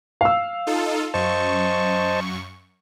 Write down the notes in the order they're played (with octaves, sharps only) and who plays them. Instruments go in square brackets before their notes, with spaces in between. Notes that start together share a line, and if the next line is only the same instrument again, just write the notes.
[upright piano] F5 E6
[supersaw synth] D#4 F4 A4
[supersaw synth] F#2 C#6 [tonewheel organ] C5 D#5 A5